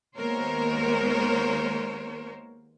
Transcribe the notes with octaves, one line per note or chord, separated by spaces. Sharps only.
D#2 G#3 B3 A#4 C5 C#5